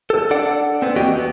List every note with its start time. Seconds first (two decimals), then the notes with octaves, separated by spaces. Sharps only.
0.10 A4
0.31 D4 A4 D5 F#5
0.82 B3 C4
0.96 E2 A#3 F#4 G4 D#5 G5
1.14 B3